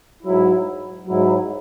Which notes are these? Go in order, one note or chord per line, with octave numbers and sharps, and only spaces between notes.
G#2 F#3 E4
G#2 F#3 E4